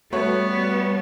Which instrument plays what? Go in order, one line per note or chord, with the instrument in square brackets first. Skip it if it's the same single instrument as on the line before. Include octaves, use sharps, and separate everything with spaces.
[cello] G3 B3 [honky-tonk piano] A3 F#4 C#5